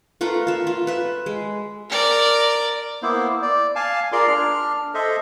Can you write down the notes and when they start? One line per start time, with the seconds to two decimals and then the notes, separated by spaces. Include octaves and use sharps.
0.21 A3 F4 A#4 B4
0.47 F4 E5
0.67 F4
0.87 B4 E5
1.26 G#3
1.90 A#4 D5
3.03 A#3 B3 E4 C5
3.42 D5
3.75 F5 G#5 A5
4.12 F4 G#4 A#4 D5 F5 C6
4.27 D4 F6
4.94 A4 C5 D#5 E5